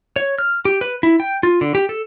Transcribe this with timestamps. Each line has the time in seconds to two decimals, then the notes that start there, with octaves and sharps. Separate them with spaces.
0.16 C#5
0.39 F6
0.65 G4
0.81 B4
1.03 E4
1.20 G5
1.43 F4
1.61 D3
1.75 G4
1.89 A4